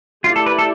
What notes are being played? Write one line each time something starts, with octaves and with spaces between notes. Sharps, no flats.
A3 E4 F4 G4 D5
A4
B4
A4